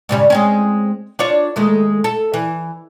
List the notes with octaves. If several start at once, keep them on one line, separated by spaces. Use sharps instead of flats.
G#2 C#3 G3
G#3 C4 C#4
D4 F4 C#5
D#2 G#3 A3
A4
E3